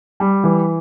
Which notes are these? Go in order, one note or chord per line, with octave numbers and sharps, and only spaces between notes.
G3
E3